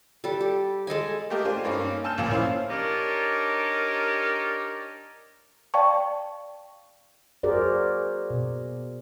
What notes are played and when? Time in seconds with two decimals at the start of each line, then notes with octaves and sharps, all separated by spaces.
0.24 G3 A4
0.41 G4
0.87 G#3 A4 D#5 G#5
1.30 A3 A#3 G4 A#4 D#5
1.45 D4 F4 C5 G#5
1.64 G2 A#3 C#4 D#4
2.04 G#5 A5 E6 F6 G6 E7
2.18 A1 D2 A#2 F3 A#3 E7
2.30 C#4 E4 C5 F5
2.70 D4 D#4 G4 A#4 C#5 D5
5.74 D5 F5 G5 A5 C#6
7.43 F#4 G#4 A#4 C5 D5
8.30 B2